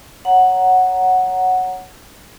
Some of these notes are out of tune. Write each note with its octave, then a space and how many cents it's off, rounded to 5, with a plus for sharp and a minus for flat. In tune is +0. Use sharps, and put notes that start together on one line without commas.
C#5 +0 F#5 +0 A#5 +0